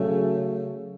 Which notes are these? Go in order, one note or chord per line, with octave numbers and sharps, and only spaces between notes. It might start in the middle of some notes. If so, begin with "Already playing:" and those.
Already playing: C#3 F#3 A3